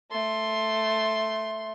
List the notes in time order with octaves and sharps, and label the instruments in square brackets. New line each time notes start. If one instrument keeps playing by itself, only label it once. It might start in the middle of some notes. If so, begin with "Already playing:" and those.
[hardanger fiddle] A3 C6